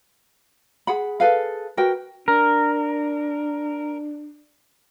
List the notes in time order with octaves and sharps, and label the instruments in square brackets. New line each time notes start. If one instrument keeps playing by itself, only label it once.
[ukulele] G#4 F#5 B5
G#4 A4 B4 F5
F#4 A#4 B4 G5
[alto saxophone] D4 [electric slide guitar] A#4